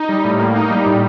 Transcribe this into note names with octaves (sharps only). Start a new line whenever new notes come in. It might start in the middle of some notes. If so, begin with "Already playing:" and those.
Already playing: D#4
G3
A2
A#3
D#4
G3
A2